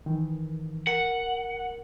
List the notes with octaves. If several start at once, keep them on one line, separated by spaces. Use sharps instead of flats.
D#3 E3
A#4 F#5